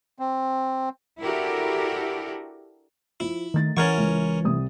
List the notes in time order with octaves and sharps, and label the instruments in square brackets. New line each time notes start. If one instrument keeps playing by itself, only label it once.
[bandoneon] C4
[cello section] D4 E4 F#4 G4 A4 A#4
[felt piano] F3 [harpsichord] E4
[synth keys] D#3 [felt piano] A3 A6
[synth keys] E3 [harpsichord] C#4 A#4 C#6 [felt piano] F#5 G#6 A6
[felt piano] C#2
C2 D#6